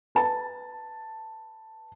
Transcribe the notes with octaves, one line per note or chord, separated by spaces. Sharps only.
B4 A5